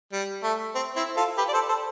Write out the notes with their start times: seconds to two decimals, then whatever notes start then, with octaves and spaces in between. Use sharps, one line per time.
0.13 G3
0.43 A3
0.75 C4
0.96 C4 E4
1.17 F4 A4
1.38 G4 B4
1.49 D5
1.53 A4 C5
1.69 A4 C5